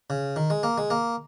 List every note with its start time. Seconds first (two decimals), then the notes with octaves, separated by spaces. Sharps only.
0.10 C#3
0.36 D#3
0.50 G#3
0.63 A#3
0.78 G#3
0.90 A#3